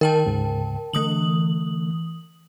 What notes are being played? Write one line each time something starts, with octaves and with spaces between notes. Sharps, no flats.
D#3 A#4 G5 A5
D2 G#2 C#3
D3 E3 A3 D#6 F#7